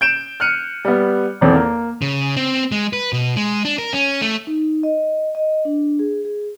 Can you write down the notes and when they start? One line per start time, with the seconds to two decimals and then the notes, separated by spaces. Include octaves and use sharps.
0.01 G6 D7 E7
0.40 F6 F#6 C#7 D#7
0.85 G3 B3
1.41 G#1 E2 C4 A4
1.55 A#3
2.02 C#3
2.36 C4
2.72 G#3
2.93 B4
3.12 B2
3.36 G#3
3.65 D4
3.78 A#4
3.93 C#4
4.21 A3
4.47 D#4
4.83 D#5
5.35 D#5
5.65 D4
5.99 G#4
6.25 G#4